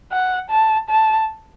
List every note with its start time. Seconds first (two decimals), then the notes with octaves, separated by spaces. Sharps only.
0.12 F#5
0.50 A5
0.89 A5